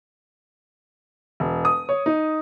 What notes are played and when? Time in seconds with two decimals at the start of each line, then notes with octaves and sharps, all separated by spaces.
1.40 E1
1.65 D#6
1.89 C#5
2.06 D#4